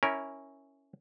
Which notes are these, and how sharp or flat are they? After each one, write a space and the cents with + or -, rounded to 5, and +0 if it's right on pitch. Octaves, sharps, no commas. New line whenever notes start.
C#4 +0 E4 -15 A#4 +0